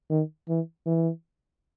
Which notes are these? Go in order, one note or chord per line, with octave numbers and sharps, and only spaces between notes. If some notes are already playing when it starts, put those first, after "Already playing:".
D#3
E3
E3